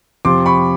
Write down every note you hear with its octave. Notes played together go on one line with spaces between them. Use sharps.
F2 C3 F3 C6 D6
B5 C#6